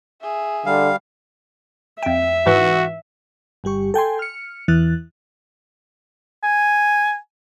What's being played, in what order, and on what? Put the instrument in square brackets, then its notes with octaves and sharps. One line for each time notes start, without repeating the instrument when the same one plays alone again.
[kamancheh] G#4 E5
[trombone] D3 [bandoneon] G3 F5
[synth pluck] F2 G5 [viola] E5
[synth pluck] G#2 E3 [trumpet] F#4
[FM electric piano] G1 G3 G4 C#6
A4 G5 G#5 C6
F6 C#7
E2 E3 F#6 A6
[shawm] G#5